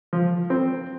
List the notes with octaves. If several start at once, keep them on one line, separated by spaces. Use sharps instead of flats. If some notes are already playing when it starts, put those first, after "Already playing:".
F3
C4